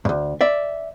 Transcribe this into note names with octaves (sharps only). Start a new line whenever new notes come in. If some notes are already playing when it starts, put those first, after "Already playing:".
D2 G2
D5 E5